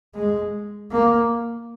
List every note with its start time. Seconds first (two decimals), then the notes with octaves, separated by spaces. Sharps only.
0.15 G#3
0.92 A#3